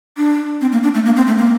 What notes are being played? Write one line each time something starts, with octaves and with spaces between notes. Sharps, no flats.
D4
C4
A#3
D4
A3
A#3
C4
A3
A#3